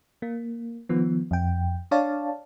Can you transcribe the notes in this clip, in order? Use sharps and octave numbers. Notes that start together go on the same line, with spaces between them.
A#3
D#3 F3 B3
F2 G5
D4 C#5 D5 F5 A5